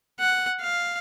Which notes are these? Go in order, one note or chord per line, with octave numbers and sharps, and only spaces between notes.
F#5
F5